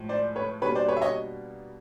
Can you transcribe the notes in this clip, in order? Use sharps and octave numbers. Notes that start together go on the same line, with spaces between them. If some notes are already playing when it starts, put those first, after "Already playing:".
Already playing: A2 F3 G#3
C5 D5
B4 C#5
B2 G3 A#3 D4 B4 C#5
C5 D5
B4 C#5
E5
C#5 D#5